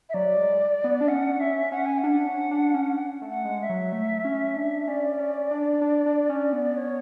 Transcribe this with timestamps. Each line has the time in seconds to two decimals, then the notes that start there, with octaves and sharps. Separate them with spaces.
0.09 E5
0.13 F#3 D5
0.37 G#3
0.84 B3
1.01 D4
1.08 C#4 F#5
1.40 C#4 E5
1.72 C#4 F#5
1.85 G#5
1.98 F#5
2.04 D4
2.26 C#4
2.51 D4
2.74 C#4
3.22 A3
3.29 F#5
3.45 G#3
3.61 E5
3.69 F#3
3.92 A3
4.25 C#4
4.56 D4
4.87 C#4 D5
5.19 C#4
5.51 D4
5.81 D4
6.06 D4
6.29 C#4
6.53 B3
6.77 C#5